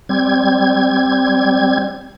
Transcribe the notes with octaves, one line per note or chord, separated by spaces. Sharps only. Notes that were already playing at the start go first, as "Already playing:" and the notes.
G3 C4 G#6